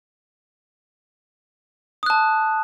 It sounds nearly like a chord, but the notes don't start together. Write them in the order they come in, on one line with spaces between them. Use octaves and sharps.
D#6 F#6 A5